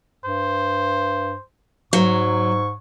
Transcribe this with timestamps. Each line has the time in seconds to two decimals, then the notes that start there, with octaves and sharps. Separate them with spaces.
0.25 G2 C5
1.93 G#2 F#3 C#6